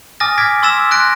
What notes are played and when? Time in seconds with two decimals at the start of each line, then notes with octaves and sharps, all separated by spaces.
0.20 G#5 D6 D#6 F6 A6 A#6
0.38 D6 F6 G#6 A6 B6 D7
0.63 C6 D6 E6 A6 B6 E7
0.91 C6 F#6 A#6 D7